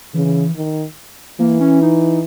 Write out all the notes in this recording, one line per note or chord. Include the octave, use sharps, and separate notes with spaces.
C#3 E3
D#3
E3 A#3
C#4
D#4